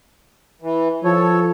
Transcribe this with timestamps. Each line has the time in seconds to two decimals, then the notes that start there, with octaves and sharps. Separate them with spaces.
0.62 E3
1.04 F3 A4 C#5